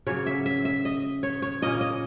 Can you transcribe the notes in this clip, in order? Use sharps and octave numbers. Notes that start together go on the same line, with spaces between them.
C#3 F#3 A#3 C#5
E5
E5
E5
D#5
C#5
C#5
A#2 A#3 C#4 D#5
D#5